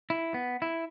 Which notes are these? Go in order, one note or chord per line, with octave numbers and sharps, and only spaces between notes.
E4
B3
E4